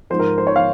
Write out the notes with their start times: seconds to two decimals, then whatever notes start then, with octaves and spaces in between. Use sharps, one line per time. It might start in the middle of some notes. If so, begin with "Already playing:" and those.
0.10 G#2 F3 C5
0.19 A#4
0.38 C5
0.47 C#5
0.56 F5